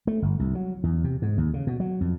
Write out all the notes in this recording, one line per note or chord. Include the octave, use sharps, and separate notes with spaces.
A3
G1
C2
F#3
E2
C3
G#2
D#2
C#3
B2
F#3
F2